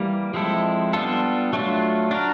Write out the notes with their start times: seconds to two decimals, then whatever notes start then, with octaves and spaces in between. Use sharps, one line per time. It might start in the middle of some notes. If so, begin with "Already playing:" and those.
Already playing: E3 G3 A#3
0.34 F3 G#3 C4 E4 A4
0.93 G3 B3 D4 F4 A4
1.53 F#3 A3 D4 F4
2.11 D4 F#4 A#4